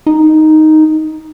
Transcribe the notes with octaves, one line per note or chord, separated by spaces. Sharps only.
D#4